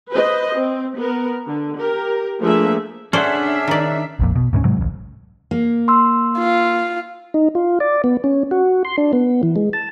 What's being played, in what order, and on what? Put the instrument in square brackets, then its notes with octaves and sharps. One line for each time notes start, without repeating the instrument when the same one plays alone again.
[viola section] B4 C5 D#5
C4
B3 A#4
D3
G4 A#4
F3 A3 A#3 D4 G#4 E5
[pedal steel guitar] C#4 G#4 F#5 [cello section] D4 E5 [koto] A4 C5 D5
[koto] D#3 D5
[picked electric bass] A#1 F2 A#2
B2
D2 G#2 E3 C#4
G#2 C3 F#3 G#3
D1 A1
[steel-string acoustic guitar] A#3
[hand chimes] C6 E6
[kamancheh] F4
[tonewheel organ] D#4
F4
D5
B3
C#4
F#4
C6
D4
B3
E3
G#3
A5